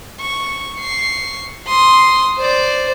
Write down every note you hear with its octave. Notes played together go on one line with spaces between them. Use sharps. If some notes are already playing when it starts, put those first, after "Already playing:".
C#6
C#6 C7
C6 D#6
C5 D5